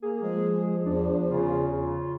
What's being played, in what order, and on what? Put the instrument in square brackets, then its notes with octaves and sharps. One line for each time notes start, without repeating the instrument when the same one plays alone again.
[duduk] A#3 [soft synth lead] G#4
[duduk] F3 [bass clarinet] G#3
[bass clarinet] E2 [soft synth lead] D4
[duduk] C#3 [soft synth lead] F4